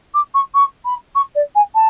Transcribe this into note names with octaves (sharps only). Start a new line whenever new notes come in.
D6
C#6
C#6
B5
C#6
D5
G#5
A5